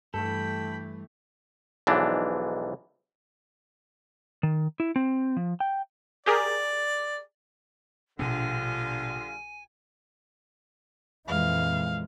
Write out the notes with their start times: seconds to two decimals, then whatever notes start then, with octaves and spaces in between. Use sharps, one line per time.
0.14 G2 E3 A3 A4 G5 B5
1.87 B1 G#2 E3 F3 D4
4.43 D#3
4.80 E4
4.96 C4
5.37 F3
5.60 G5
6.26 G4 G#4 A#4 D5
8.19 A#1 B2 D3 G3 D4 F4 G#5
11.28 F2 A#2 E3 G#3 F5